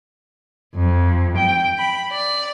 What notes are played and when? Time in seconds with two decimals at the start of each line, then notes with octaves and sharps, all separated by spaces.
0.75 F2
1.37 G5
1.78 B5
2.12 D5